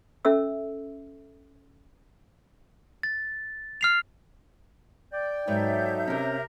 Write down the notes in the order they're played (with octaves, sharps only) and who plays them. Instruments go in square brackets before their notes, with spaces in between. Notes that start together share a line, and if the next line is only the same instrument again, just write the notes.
[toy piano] C#4 A4 E5 E6
[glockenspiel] A6
F6 C7 F7
[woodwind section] D5 G5
[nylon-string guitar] G#2 B4 C#5 [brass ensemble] F#3 D#4 A4 [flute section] E5 G6
[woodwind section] C3 A#4 [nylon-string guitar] C4 C#4